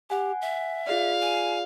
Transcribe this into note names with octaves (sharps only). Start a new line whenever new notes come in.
G4 F#5 G#5
E5
F4 G#4 D5 F5
G#5